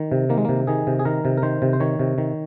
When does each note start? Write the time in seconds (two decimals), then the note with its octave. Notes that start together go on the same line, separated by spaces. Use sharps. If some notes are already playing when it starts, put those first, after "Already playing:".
Already playing: D#3
0.12 C3
0.29 D#3 A#3
0.37 G#3
0.45 C3 A#3
0.67 D#3 G#4
0.87 C3
0.99 G#4
1.05 D#3 A#4
1.25 C3
1.37 A#4
1.42 D#3 C5
1.62 C3
1.73 C5
1.80 D#3 C#5
1.99 C3
2.18 D#3